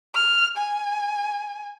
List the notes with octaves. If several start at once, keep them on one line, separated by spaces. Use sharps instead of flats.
F6
G#5